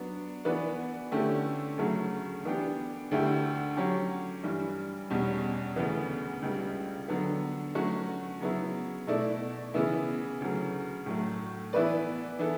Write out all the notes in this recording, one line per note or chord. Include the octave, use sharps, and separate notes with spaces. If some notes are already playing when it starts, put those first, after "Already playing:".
Already playing: F#3 B3 D4
E3 B3 F#4 B4 D5
D3 A3 C#4 E4 G4
D2 C#3 F#3 A3
E3 B3 D4 G4
D2 D3 A3 E4 G4
F#3 C#4 G4 C#5
G2 E3 G3
E2 B2 G3 C#4
D2 C#3 E3 B3
C#2 C#3 G3
D3 F#3 B3
F#3 A3 C#4 F#4
C#3 F#3 B3 E4
B2 A3 E4 A4 D5
C#3 E3 B3 E4
D2 C#3 F#3
A2 F#3 A3
E3 B3 E4 B4 D5
E3 B3 E4 A4